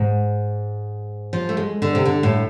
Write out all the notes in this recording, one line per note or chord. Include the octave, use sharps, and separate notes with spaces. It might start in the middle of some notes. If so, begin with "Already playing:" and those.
Already playing: G#2
F3
A3
G#3
D3
C3
D3
A2